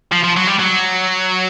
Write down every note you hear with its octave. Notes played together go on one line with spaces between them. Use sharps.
F3
F3
F#3
G3
F#3